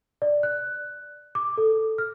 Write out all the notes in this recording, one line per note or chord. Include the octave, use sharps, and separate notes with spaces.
D5
F#6
D6
A4
F6